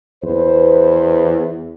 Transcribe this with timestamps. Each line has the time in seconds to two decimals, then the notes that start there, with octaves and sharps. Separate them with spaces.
0.23 E2 B4 C5